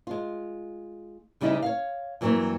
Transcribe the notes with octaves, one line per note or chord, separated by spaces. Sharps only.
G#3 F4
D2 C#3 G3 D#4 E4 D#5
C#5 F5
G2 E3 F#3 G3 A#3 C4